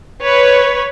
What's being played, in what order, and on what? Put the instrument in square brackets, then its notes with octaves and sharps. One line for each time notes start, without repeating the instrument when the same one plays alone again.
[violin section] B4 C#5